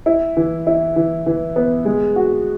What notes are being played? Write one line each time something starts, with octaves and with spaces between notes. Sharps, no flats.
E4
E3
E4
E3
E3
B3
G#3
F#4